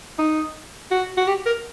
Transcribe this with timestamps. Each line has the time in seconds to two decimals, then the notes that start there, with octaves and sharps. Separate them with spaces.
0.18 D#4
0.91 F#4
1.17 F#4
1.27 G4
1.46 A#4